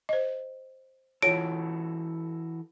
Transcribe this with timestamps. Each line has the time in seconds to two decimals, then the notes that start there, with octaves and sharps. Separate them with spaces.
0.09 C5 D#5
1.23 E3 F4 F#4 A4 C#5 D7